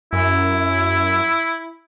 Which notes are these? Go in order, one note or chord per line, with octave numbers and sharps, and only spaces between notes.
F#2 E4